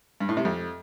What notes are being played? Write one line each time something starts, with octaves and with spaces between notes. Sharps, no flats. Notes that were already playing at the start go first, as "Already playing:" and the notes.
G2
A2
C3
F2